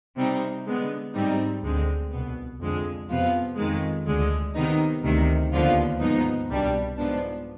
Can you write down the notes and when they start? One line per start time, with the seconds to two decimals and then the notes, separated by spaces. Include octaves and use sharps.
0.16 C3 G3 C4 D#4
0.66 D3 G#3 B3
1.15 G#2 G3 C4 D#4
1.63 D2 D3 G#3 C4
2.12 C2 B2 B3
2.60 F2 D3 G#3
3.09 F2 C3 F3 B3 F4
3.57 F2 D#3 G#3
4.06 D2 D3 G#3
4.55 C3 D#3 B3 D#4
5.03 D2 C3 D#3
5.52 D#2 D3 F3 B3 F4
6.00 G#2 F3 B3 D#4
6.49 C2 B2 G3 D4
6.97 G#2 F3 B3 D4